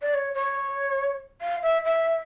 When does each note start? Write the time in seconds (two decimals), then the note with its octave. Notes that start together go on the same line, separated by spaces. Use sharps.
0.02 D5
0.14 C#5
0.34 C#5
1.42 F5
1.63 E5
1.85 E5